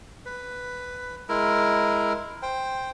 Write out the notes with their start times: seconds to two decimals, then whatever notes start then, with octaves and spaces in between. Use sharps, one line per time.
0.26 B4
1.29 G#3 E4 A#4
2.42 C5 G5